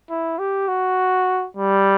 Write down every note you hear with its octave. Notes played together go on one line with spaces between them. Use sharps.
E4
G4
F#4
G3